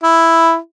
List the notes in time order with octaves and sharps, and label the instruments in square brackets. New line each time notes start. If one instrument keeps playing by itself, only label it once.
[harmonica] E4